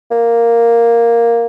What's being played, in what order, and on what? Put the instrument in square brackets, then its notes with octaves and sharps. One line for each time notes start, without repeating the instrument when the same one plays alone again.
[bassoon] A#3